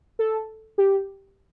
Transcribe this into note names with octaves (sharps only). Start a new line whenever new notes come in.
A4
G4